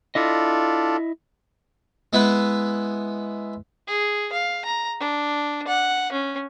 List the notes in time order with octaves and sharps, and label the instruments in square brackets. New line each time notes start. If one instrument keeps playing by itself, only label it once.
[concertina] D4 F4 A4 [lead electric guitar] E4 D#5
[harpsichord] G#3 B3 E4 B4
[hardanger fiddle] G#4
F5
A#5
D4
F#5
C#4